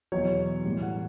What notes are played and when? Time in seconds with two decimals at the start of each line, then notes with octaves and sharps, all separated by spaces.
0.12 E2 B2 F#3 C#5
0.65 A2 E3 G3
0.83 F#5